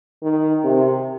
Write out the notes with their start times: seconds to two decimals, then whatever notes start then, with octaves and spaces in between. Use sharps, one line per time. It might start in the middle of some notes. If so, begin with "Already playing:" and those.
0.23 D#3
0.64 C3